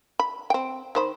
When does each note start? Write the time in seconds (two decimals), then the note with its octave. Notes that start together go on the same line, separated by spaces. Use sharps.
0.19 B5
0.50 C4 G5
0.95 D#3 C5 B5